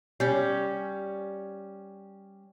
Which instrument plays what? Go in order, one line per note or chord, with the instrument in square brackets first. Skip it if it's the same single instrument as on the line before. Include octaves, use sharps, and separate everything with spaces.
[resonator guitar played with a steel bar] G3 C#4